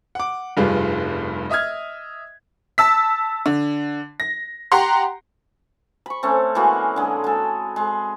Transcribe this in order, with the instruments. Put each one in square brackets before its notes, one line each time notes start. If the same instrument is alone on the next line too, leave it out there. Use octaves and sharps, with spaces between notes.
[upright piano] F#5 D6
F1 G2 G3 F4 G#4 B4
D#5 E5 D#6 F6 G#6
[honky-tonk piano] A5 E6 B6
D3
A#6
G4 F#5 A#5 C6
[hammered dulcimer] B5 C#6
A3 C4 C#4
E3 G#3 A#3 F#4
D3 G#3
G#3 A4
G#3